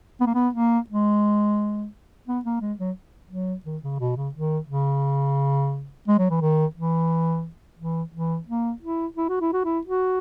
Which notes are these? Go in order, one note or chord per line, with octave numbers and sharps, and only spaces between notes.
B3
A#3
B3
A#3
G#3
B3
A#3
G#3
F#3
F#3
D#3
C#3
B2
C#3
D#3
C#3
G#3
F#3
E3
D#3
E3
E3
E3
A#3
E4
E4
F#4
E4
F#4
E4
F#4